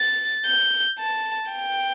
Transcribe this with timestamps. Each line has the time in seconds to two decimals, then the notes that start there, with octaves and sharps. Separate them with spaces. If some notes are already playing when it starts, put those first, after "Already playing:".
Already playing: A6
0.47 G6
0.99 A5
1.52 G5